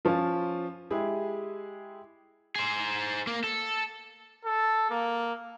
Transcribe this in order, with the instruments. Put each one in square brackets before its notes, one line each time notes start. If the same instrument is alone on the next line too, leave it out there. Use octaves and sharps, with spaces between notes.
[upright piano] F3 C#4 F4
G#3 E4 G4 G#4
[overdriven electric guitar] G#4 C5
A#3
A4
[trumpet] A4
A#3